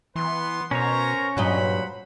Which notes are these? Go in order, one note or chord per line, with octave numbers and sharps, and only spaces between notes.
E3 B3 B4 C6
B2 C#4 A#4 C5 C#5 A#5
G2 A#2 F#3 C5 D#5 F#5 B5